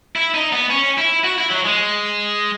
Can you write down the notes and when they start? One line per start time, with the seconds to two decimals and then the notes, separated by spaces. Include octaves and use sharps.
0.16 E4
0.34 D#4
0.53 B3
0.70 C#4
0.98 E4
1.24 F#4
1.38 E4
1.50 F#3
1.65 G#3